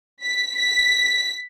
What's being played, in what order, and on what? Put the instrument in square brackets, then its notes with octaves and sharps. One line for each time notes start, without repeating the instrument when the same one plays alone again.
[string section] B6
B6